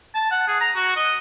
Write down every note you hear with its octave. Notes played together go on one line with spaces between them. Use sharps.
A5
F#5
G#4
A#5
F#4
D#5